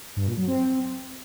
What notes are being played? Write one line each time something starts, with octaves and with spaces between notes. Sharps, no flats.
G2
A#2
F#3
C4